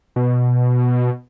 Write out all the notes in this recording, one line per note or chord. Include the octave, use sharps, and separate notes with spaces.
B2